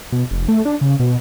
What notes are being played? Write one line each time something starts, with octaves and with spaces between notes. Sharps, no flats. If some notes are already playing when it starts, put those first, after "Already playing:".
B2
F1
A3
D4
C#3
B2